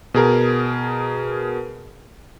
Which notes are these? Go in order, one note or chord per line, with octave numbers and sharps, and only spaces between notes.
B2 G#4 A#4